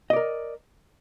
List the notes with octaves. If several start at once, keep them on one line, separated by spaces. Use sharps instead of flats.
A#4 D5 D#5